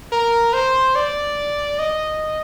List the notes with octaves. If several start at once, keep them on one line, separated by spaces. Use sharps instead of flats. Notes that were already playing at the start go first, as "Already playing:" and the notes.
A#4
C5
D5
D#5